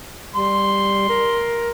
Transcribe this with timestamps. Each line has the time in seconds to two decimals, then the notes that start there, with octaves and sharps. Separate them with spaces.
0.35 G3 C6
1.09 A#4